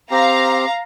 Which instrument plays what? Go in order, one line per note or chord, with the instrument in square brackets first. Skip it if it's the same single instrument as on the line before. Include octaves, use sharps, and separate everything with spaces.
[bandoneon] C4 G4 [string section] F5 A#5